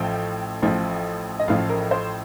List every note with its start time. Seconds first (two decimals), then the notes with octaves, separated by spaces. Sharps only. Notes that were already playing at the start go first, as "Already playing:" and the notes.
Already playing: A1 A2 F3 G5
0.62 A1 A2 F3
1.39 D#5
1.48 A1 A2 F3 F5
1.69 A#4
1.91 C5